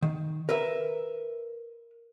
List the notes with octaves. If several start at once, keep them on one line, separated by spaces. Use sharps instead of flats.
D#3
A#4 B4 E5